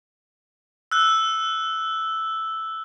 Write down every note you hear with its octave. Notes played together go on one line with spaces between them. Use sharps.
E6 F#6